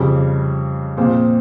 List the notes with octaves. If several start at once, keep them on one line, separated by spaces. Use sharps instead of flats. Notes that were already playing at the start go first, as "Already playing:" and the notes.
Already playing: F2 C#3 G3
A#2 F3 C4 F4 G#4